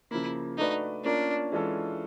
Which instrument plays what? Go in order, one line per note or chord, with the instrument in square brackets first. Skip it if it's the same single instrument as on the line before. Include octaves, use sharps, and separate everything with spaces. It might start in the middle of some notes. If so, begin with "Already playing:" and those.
[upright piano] C#3 F3 A#3 [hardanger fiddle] E4
[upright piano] A3 D4 F#4 B4 D5 [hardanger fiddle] D#4
[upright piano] A#3 C#4 F4 A#4 [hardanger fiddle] D4
[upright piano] E3 G#3 C#4 F4 A4